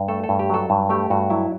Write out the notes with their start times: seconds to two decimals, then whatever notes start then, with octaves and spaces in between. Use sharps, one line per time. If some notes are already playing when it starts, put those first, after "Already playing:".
Already playing: G2
0.08 A3 A4
0.24 A4
0.29 G2
0.39 G4
0.50 F#3 A4
0.70 G2
0.89 A3 G4
1.10 G2 F#4
1.30 F#3 E4